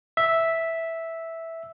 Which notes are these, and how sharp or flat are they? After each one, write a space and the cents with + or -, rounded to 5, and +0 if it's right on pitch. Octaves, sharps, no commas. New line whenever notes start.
E5 -5